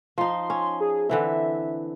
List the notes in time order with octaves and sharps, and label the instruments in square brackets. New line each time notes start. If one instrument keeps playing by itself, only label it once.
[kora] F3 D#4 [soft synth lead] C6
[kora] C#4
[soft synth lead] G#4
[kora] D3 E3 C4 [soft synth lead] E5